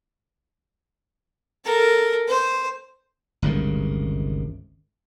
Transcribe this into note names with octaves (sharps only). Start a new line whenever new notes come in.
A4 A#4
C5
G1 C#2 C3 D#3